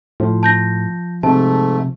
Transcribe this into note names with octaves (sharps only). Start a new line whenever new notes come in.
A2 F3
A5 G6 A#6
G#2 C3 A3 A5